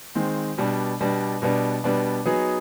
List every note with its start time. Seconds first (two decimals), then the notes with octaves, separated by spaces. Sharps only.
0.15 D#3 G#3 C4
0.58 B2 G3 B3 D4
1.00 B2 G3 B3 D4
1.42 B2 G3 B3 D4
1.84 B2 G3 B3 D4
2.26 F#3 B3 D#4 G#4 B4